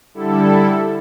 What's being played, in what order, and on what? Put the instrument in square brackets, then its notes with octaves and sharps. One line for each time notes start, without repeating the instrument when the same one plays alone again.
[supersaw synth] D3 G3 E4 A4